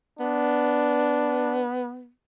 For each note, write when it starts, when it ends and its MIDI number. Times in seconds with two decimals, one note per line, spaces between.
0.19 2.09 59
0.19 1.65 62